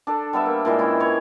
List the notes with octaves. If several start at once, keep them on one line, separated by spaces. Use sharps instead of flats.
D4 A4
G3 B3 A4 E5
A#3
A#2 E3 G#3 G5
C#4 E4
B4 C#5